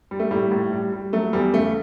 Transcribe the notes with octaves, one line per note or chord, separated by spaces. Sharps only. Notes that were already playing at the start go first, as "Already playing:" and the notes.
G3
A3
A2 G3
A2
G3
G3
F#3 A3
E2 G3
C#3 A3